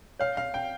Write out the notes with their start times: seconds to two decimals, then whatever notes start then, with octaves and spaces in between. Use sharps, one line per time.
0.20 C#5 F5
0.37 F5
0.54 F#5 G5